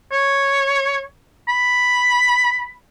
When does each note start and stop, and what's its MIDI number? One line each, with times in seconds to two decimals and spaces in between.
0.12 1.04 73
1.48 2.72 83